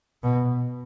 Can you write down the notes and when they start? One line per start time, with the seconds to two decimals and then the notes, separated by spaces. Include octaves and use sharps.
0.23 B2